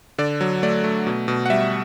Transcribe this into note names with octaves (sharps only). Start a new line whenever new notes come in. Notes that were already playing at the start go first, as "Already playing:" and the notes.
D3 D5
F#3
A3 D5
A3
B2
B2
F#5
G3 E5